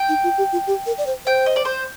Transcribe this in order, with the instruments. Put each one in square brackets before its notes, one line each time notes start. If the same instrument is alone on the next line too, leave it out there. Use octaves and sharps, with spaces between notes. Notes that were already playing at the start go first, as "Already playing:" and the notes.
Already playing: [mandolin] G5
[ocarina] D#4
F4
G4
F4
G4
A#4
D5
C5
[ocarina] C5 [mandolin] G5
[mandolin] D#5
D5
C5